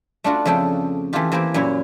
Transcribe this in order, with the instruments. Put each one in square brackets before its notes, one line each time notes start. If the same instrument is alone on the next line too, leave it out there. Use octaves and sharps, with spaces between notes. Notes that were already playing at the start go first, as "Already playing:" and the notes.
[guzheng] A3 D4 F4 F#4
F2 C#3 A3 A4 G5
E3 A3 B3 E4 F4 G4
E3 A#3 C4 E4 G4
F#2 A#2 E4 C#5